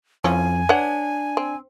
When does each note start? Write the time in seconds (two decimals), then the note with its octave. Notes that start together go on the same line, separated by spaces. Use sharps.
0.24 F2 E3 F3 C#4 G#5
0.69 D4 B4 C#5 F#5
1.37 C4